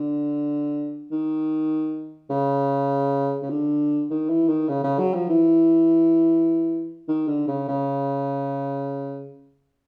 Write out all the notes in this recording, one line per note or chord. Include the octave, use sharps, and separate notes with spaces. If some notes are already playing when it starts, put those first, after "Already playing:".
Already playing: D3
D#3
C#3
C#3
D3
D#3
E3
D#3
C#3
C#3
F#3
F3
E3
D#3
D3
C#3
C#3